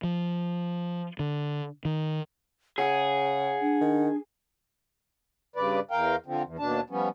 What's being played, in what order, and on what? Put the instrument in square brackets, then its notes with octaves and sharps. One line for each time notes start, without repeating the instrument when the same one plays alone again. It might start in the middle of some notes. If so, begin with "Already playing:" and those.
[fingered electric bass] F3
D3
D#3
[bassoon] C#3 [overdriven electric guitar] G#4 [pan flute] F#5
[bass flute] D4
[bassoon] D#3
[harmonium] G2 C#3 B4 D5
E2 A#4 F5 G5
D3 F3 C4
E2
D#2 B2 D4 A5
F3 G3 B3 C#4